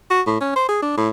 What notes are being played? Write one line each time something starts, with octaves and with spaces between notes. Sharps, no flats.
F#4
A2
C#4
C5
G#4
D4
A2